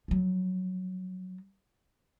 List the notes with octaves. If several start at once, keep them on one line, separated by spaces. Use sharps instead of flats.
F3 F#3